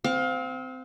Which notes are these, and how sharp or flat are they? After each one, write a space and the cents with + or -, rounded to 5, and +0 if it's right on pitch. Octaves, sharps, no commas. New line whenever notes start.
C4 -20 F5 +25